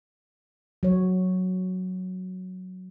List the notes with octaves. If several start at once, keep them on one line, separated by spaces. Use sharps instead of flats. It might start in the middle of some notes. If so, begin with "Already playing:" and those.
F#3 C#5